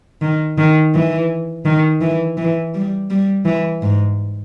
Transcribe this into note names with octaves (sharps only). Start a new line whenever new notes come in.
D#3
D#3
E3
D#3
E3
E3
G3
G3
E3
G#2